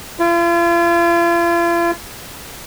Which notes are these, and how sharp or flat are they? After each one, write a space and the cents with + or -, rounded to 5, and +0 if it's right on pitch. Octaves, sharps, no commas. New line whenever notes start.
F4 -40